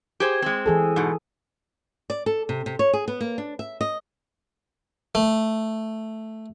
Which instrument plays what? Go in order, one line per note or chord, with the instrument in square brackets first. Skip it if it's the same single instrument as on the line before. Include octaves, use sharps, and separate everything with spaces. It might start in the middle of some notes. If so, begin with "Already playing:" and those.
[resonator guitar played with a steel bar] G4 G#4 C5
G#3 C4
[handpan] E3 G#4 A4
[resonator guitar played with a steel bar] G#2 B2
[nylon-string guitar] D5
A4
C3
C3
C#5
G#4
B3
A#3
D4
E5
D#5
[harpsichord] A3